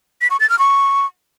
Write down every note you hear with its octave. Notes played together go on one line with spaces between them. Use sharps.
B6
C#6
A6
F6
C#6